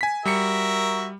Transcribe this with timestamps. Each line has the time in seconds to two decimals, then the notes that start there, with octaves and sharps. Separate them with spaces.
0.01 G#5 B6
0.25 G3 F#4 A#4 E5 C#7